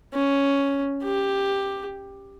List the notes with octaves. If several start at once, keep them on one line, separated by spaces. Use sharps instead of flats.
C#4
G4